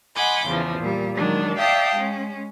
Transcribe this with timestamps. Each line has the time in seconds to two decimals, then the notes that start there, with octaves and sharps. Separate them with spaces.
0.15 D#5 F#5 G#5 B5 C6 D6
0.46 E2 C#3 E3 F3
0.79 A#2 G3
1.15 D#3 F#3 G#3 D4
1.58 D5 E5 F5 G5 A5 D#6
1.95 G#3 C#4